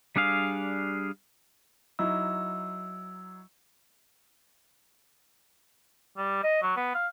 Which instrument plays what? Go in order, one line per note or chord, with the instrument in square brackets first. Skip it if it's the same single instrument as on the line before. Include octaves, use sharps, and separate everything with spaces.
[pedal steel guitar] G3 D4 G#4 F5
[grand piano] F#3 D#4 E4 [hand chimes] E6
[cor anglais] G3
D#5
F#3
B3
F5